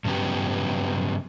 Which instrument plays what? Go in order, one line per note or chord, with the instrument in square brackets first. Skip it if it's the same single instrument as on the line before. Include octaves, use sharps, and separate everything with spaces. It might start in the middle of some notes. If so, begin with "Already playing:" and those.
[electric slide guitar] G2 C#3 F#3 B3 G4